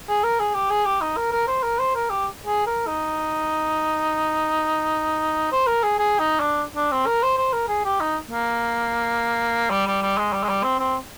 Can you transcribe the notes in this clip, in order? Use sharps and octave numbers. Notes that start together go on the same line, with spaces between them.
G#4
A#4
G#4
G4
G#4
G4
D#4
A#4
A#4
C5
A#4
C5
A#4
G4
G#4
A#4
D#4
C5
A#4
G#4
G#4
D#4
D4
D4
C4
A#4
C5
C5
A#4
G#4
G4
D#4
A#3
G3
G3
G3
G#3
G3
G#3
G3
C4
C4